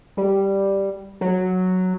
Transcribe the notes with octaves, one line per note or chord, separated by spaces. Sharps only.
G3
F#3